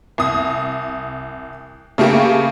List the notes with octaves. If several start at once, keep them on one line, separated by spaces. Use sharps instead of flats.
C2 D#6
C#3 A3 A#3 G4